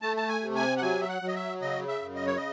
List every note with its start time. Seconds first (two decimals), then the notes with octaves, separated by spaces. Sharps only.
0.02 A3 A5
0.17 A5
0.29 G#5
0.42 C3
0.56 G#5
0.77 F#5
0.82 F#3 G#5
1.01 E5
1.08 F#5
1.22 F#3
1.28 D#5
1.35 E5
1.61 C#3 D#5
1.88 E5
2.02 F#2
2.15 D#5
2.26 C#5
2.37 D#5